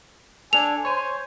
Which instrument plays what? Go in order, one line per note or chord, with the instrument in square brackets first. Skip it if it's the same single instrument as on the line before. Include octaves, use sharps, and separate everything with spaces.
[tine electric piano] D4 A4 [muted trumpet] G#5 [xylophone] F7
[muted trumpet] C5 [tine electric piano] C#5 G#5